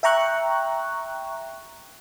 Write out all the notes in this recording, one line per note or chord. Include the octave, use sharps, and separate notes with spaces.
E5 G5 A#5 C#6 F#6